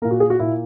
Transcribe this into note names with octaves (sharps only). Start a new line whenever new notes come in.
A#2 A#3 A#4
F#4
G#4
F#4
A#2 A#3 E4